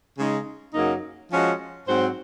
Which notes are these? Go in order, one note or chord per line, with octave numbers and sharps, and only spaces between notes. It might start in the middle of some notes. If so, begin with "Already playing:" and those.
C#3 G#3 D#4
F#2 C#3 F#3 A#3 D#4
F3 G#3 C#4 F#4 C#5
G#2 F#3 C4 F#4 C5